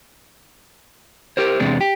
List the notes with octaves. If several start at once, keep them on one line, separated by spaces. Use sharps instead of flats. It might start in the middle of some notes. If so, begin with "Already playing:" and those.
G4 A#4 C5
E2 C3 G#3 D4
G4